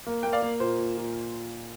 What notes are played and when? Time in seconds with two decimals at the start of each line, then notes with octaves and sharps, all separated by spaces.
0.07 A#3
0.23 A#3 G5
0.33 D5 F5
0.42 A#3
0.60 A#2 C5
0.78 A#2
0.97 A#2